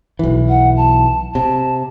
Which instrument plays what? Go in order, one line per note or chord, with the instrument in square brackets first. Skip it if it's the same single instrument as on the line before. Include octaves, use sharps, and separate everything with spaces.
[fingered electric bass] B1 E3
[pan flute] F#5
A5
[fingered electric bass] C3 [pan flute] A5